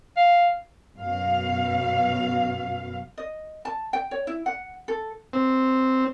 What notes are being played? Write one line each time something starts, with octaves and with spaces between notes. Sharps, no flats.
F5
F#2 B2 F5
D#5
A5
G5
C#5
E4
F#5
A4
C4